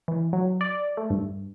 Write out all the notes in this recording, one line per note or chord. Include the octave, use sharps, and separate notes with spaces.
E3
F#3
D5
A3
G2